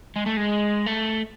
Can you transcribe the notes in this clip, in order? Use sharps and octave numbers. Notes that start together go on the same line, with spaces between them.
G#3
A3
G#3
A3